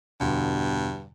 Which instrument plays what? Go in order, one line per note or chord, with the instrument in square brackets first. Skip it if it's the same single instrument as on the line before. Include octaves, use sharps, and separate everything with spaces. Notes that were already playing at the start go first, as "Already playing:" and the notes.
[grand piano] E2 B2 D3 [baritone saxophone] G2